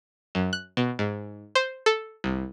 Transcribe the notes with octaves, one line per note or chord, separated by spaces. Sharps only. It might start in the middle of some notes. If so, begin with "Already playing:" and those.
F#2
F#6
B2
G#2
C5
A4
C2